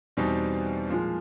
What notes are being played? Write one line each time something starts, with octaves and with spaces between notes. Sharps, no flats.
E2 B2 G3 C4 D#4
A#2 F3 G#3